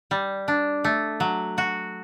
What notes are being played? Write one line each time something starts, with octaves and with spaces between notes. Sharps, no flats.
G3
D4
A3
F#3
F#4